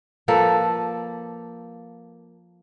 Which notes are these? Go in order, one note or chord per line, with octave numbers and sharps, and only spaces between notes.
F3 A#3 A4 B4